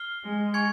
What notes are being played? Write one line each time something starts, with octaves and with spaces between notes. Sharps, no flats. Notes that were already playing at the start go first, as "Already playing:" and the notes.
Already playing: F6 C7 G7
G#3
G#5 C#6 G#6 C#7 F7